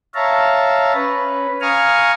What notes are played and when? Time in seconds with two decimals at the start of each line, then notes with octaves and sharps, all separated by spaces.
0.14 C#5 E5 F5 A5 A#5
0.93 C#4 B4
1.61 F5 G#5 A#5 C#6 D#6 F6